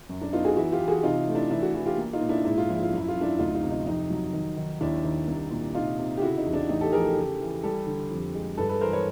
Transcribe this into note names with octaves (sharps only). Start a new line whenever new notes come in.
F#2
D4
B3 D#4 F4
F#4 G#4
E3 E4 F#4
F4 G4
E3
F#4 G#4
C3 D#4 F4
A3
D4 E4
E3 D4 E4
E4 F#4
E3 E4 F#4
F4 G4
A#3
D#4 F4
A#2
D4 E4
G#2 E4
F4
A#1 E4
F4
F#2 E4
F4
F#2
D4 E4
D2 D#4 F4
D#4 F4
C3
D#4
F2 D#4
F#3
D#3
D#3
D#2 D4 E4
D#3
C2
A#2
C3 D#4 F4
C3
G4
C#3 E4 F#4
D#4
E2
D4
A1 D#4
G4 A4
F3 G#4 A#4
G4 A4
C#3
E3
G3 G4 A4
D3
F2
G#3
G2 A4 B4
A4 B4
E3 A#4 C5
B4 C#5